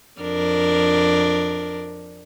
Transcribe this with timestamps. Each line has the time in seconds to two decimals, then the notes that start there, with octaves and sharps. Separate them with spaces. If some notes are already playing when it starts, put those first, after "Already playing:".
0.21 F2 D4 A#4